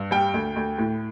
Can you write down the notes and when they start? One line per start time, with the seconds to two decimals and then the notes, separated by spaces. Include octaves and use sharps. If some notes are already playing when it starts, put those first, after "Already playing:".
Already playing: G2
0.11 G3 G5
0.34 D2
0.56 D2
0.78 A2